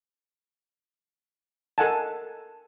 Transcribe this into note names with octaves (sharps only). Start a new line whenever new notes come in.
A4 A#4 D#5 F#5 G#5 A5